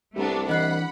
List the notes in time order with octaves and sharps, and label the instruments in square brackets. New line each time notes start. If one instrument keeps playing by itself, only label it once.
[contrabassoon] C2 [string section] A3 B3 D4 [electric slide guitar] G4 A4 A#5
[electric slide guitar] E3 D4 A#4 [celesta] D#5 F#6 C7 [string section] F#5 B5